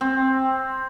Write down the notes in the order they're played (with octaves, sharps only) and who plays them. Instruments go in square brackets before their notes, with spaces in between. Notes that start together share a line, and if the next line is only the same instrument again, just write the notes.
[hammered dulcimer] C4